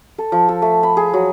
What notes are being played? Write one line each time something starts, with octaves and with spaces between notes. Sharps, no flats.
A4
F3
A4
A3
B5
G#4
F#3